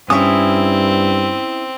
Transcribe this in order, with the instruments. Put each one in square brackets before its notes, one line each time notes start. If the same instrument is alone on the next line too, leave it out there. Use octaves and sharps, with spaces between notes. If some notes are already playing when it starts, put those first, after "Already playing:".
[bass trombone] G2 [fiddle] C4 [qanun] C#4 C#5 [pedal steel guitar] E4 D#6